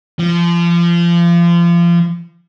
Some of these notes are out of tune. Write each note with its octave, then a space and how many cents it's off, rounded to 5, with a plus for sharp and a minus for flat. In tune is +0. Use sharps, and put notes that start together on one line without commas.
F3 -30